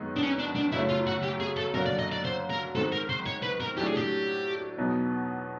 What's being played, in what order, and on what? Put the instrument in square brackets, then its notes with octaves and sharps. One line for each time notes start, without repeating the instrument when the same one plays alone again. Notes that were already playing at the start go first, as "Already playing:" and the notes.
Already playing: [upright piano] F#2 D#3 G#3 B3 D#4
[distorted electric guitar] D4
C#4
D4
D4
[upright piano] F#2 C#3 F#3 A3 C#4 [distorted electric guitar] E4
[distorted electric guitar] F4
F#4
G4
G#4
A4
[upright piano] F#2 D3 F#3 A#3 [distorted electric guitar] A#4
[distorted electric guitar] D5
D#5
D5
C5
A#4
[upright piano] G#2 D#3 G#3 C4 [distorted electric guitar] A4
[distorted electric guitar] A#4
C5
C#5
B4
A#4
[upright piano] A2 F#3 A3 D4 [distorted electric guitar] G4
[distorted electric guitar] G#4
G4
[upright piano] E2 B2 F#3 B3 D#4